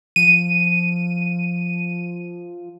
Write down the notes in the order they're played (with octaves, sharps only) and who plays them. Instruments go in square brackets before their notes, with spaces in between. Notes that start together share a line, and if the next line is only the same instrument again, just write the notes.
[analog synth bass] F3 [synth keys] D#7